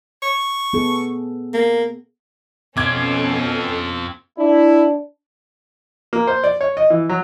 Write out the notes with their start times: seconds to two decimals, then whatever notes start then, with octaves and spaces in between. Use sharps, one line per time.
0.22 C#6
0.73 B3 G#4 A4
1.53 A#3
2.77 B2 C4 C#4 F4 A4 D6 G#6
4.38 D4 E4
6.13 A#3
6.27 C5
6.44 D5
6.61 C#5
6.77 D#5
6.90 E3
7.09 F#3